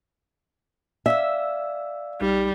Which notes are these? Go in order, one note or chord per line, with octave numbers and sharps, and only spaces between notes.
D5 E5 F5 E6
A#1 G3 D#4 G4